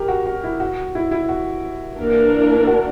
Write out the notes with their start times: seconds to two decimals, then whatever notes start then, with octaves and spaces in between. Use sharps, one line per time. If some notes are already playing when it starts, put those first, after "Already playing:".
Already playing: G4 A#4
0.08 F#4
0.26 F#4
0.44 E4
0.60 F#4
0.95 E4
1.11 E4
1.29 F#4
1.98 E3 A#3 D4 A#4
2.67 F#4